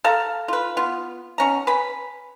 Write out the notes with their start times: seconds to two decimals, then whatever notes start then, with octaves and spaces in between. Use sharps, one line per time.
0.04 A4 F5 A#5
0.48 F4 B4
0.77 B3 F4
1.38 B2 C#4 A#5
1.67 B4 G#5 B5